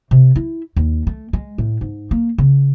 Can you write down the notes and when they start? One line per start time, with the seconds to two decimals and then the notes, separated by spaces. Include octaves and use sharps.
0.11 C3
0.36 E4
0.76 D#2
1.07 A3
1.33 G#3
1.58 A2
1.81 G#2
2.11 A#3
2.38 C#3